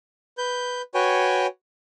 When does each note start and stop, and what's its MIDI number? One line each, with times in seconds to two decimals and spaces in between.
0.38 0.82 71
0.38 0.82 91
0.95 1.47 66
0.95 1.47 71
0.95 1.47 73
0.95 1.47 79
0.95 1.47 80